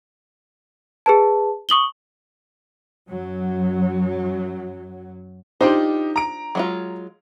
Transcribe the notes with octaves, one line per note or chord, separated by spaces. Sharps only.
G#4 B4 A5
C#6 D#6 F#7 G7
F#2 F#3
D4 D#4 F4 G4 C5
A#5 D7
F#3 G#3 F4